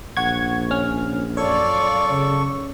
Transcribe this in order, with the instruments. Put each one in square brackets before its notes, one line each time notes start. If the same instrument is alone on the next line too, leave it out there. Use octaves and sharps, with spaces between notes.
[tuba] A#1 [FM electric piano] F#5 C#6 G#6
[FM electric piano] C#4 F6
[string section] F#2 F4 D5 [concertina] A4 C#6 [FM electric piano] C#5
[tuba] C#3